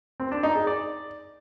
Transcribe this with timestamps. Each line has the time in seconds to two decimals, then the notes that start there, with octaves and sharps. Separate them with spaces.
0.20 C4
0.31 D4
0.43 D#4
0.55 G#4
0.67 D5